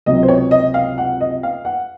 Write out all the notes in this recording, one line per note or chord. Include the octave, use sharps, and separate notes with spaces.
C#2 C3 F#3 D#5
C5
C#5
D#5
F5
F#5
D#5
F5
F#5